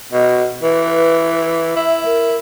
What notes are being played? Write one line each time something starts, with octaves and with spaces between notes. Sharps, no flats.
B2 D#5
E3 B4
E4 E5
A#4